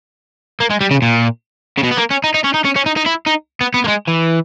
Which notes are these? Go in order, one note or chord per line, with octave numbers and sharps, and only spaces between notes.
A#3
G#3
G3
C#3
A#2
C#3
B2
B3
A#3
C#4
D#4
D#4
C#4
D#4
C#4
C#4
D#4
D#4
E4
D#4
B3
B3
A#3
G#3
E3